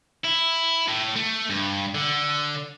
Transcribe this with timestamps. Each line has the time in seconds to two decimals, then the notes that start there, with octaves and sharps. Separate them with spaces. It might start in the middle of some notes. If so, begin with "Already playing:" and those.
0.25 E4
0.88 A2
1.16 A3
1.50 G2
1.95 D3